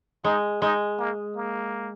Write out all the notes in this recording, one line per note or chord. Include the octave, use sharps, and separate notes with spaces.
G#3 D#4
G#3 D#4
A#3
A#3